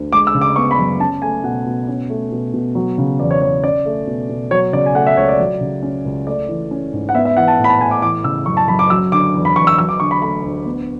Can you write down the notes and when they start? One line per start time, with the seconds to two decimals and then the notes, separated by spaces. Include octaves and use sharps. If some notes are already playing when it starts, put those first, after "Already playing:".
Already playing: D2
0.13 G#3 D6
0.27 E6
0.34 C#3
0.41 D6
0.56 B3 C#6
0.71 B5
0.79 F#2
1.00 C#4 A5
1.22 A3 G#5
1.44 B2 F#5
1.66 B2
1.88 C#4
2.10 A3
2.32 B2
2.54 B2
2.75 F#3
2.98 C#3
3.20 E2 D5
3.31 C#5
3.41 E2 C#5
3.63 C#4 D5
3.86 A3
4.07 B2
4.29 B2
4.51 F#3 C#5
4.73 C#3 D5
4.86 G#5
4.95 A3 F#5
5.07 E5
5.17 C#2 C#5
5.28 D5
5.39 F#3
5.61 C#3
5.83 C#4
6.05 C#2
6.27 A3 D5
6.49 E3
6.71 C#4
6.93 G#2
7.09 F#5
7.15 B3 E5
7.25 E5
7.36 E3 F#5
7.48 A5
7.58 A2
7.64 B5
7.69 A5
7.80 A2 G#5
7.91 D6
8.02 E3 D6
8.24 C#3 E6
8.46 F#2 C#6
8.57 A5
8.68 F#2 B5
8.79 D6
8.90 F#3 E6
9.12 D3 D6
9.34 E2
9.45 B5
9.56 E2 C#6
9.67 E6
9.78 F#3 E6
9.89 D6
10.00 D3 C#6
10.11 B5
10.22 A3 B5
10.43 D2
10.66 B3